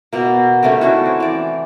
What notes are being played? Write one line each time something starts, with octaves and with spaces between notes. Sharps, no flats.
B2 A#3
D#3 G3 A3 C#4
C#4 D4 E4 F#4
C4
E3 D5